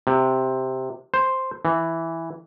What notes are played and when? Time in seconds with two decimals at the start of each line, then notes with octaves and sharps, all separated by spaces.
0.07 C3
1.14 C5
1.65 E3